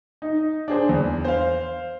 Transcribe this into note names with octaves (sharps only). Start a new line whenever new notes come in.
D#4
D4 G#4 C5
E2
C5 F5